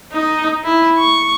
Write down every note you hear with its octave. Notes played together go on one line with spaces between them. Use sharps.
D#4
E4
C#6